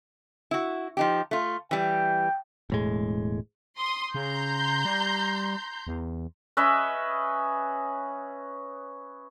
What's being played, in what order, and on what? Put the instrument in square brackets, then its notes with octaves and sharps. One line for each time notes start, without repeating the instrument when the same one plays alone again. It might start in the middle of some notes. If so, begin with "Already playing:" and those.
[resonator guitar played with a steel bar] E4 F#4
F3 D#4 G4
A3 F4
[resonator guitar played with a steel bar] E3 G3 [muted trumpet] G5
[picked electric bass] E1 A2 G#3
[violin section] C6 D#6
[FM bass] C#3 [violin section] A#5 C6 G6
[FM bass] G3
E2
[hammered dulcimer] C#4 B4 D#5 E5